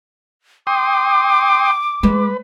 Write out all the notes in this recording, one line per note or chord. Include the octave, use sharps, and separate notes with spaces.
G5 C6 D6 D#6
G#3 B4